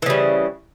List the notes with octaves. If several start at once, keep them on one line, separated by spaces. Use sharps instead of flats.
C#3 E3 G3